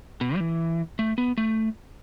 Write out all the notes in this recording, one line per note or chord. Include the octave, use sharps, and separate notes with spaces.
B2
G3
E3
A3
B3
A3